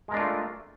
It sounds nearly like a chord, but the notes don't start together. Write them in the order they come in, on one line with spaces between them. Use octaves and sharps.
G#3 A#4 D4 F4 A3